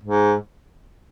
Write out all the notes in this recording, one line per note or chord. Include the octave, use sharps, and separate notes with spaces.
G#2